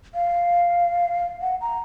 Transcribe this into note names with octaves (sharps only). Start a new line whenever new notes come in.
F5
F#5
A#5